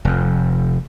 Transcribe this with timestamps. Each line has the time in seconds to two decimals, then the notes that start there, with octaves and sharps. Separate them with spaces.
0.05 F1 F2